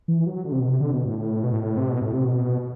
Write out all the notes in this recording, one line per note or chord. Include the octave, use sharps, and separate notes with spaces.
E3
F#3
D3
C3
B2
C3
D3
B2
A2
B2
A2
C3
B2
A2
C3
B2